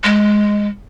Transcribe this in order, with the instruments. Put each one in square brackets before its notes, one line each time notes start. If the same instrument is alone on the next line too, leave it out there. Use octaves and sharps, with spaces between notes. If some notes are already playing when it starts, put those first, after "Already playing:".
[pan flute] G#3